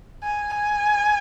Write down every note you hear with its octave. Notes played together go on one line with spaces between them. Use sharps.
G#5
G#5